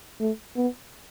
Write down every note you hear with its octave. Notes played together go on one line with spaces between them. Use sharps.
A3
B3